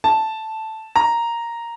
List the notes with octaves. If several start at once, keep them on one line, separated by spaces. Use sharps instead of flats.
A5
A#5